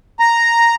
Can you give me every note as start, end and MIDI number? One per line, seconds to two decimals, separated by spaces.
0.20 0.75 82